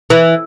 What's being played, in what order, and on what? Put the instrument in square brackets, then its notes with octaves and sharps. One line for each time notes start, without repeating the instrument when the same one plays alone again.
[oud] E3